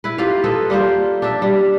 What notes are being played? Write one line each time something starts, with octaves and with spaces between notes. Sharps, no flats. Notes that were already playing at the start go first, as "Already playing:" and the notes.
E4 B4
A#3 F4 G4 F5
F4 A4 B4 D#5
G3 A#3 F4 C5
D4 E5
G3